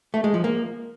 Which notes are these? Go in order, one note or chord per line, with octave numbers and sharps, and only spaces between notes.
A3
G#3
F3
A#3